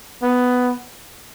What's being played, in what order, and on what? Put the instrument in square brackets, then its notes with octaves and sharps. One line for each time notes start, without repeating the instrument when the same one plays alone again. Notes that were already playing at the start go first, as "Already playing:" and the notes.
[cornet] B3